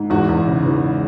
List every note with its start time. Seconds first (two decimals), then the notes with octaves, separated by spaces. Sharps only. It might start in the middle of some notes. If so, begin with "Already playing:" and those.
Already playing: G#2
0.10 E2 F#4
0.29 E2
0.48 C#3
0.65 E3